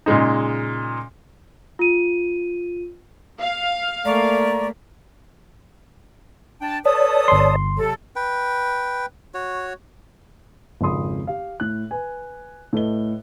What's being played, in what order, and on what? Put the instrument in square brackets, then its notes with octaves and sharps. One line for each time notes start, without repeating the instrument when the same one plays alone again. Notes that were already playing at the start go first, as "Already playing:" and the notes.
[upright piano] A#2 C#3 G#3 D#4
[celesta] F4 D#7
[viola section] F5
[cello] A3 A#3 [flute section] D5 A#5 C#6
[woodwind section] D4 G5 A5
[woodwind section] A4 B4 D#6 [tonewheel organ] C#5 D5 A5
[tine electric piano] G1 C6
[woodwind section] C3 F#3 A4
[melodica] B4 G5
F#4 C#5
[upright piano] G#1 F2 C#3 B5 C6 D#6
G4 F5
A2 F#6
B4 G#5
A2 A4 B4 D#5 G7